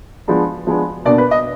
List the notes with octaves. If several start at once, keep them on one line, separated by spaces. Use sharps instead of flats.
F3 G#3 B3 D4
F3 G#3 B3 D4
B2 A#3 D4 D5
B4
D#5